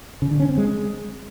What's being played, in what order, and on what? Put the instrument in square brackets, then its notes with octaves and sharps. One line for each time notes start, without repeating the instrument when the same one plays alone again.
[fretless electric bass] C#3
D3
C#4
C4
G#3